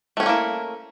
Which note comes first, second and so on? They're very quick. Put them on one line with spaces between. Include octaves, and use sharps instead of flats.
A3 C#4 C4 A#3 E4